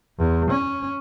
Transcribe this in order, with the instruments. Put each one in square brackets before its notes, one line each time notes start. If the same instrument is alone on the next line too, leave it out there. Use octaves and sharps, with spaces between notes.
[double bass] E2
C#4